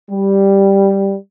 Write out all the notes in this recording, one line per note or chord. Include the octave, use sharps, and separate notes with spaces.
G3